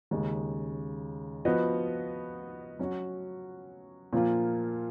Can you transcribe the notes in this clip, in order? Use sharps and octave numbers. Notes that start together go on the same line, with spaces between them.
D#2 C#3 G#3
F3 B3 F#4 B4 D#5
F#3 C#4 F#4
A#2 F3 A#3 F4